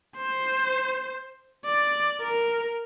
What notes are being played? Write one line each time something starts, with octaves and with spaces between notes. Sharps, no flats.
C5
D5
A#4